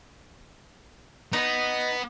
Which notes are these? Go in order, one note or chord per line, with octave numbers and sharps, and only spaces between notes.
B3 D#4